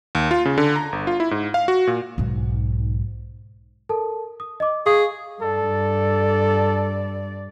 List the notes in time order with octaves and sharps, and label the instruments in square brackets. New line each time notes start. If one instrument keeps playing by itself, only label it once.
[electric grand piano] D#2
F4
C#3
D3
A#5
G1
F4
E4
G#2
F5
F#4
A#2
[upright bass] B1 G#2
[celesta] A4 A#4 A5
D#6
D#5 D6
[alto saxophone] G#4 [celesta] F5 C#6 D#6
[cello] G2 D5 [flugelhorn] A4